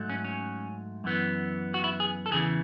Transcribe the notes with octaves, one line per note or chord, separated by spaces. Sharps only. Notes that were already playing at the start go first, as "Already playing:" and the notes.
Already playing: G#2 F#3 A3
C#4
C#4
F#2 E3 B3
F#4
E4
G#4
A4
E2 C#3 E3 G#4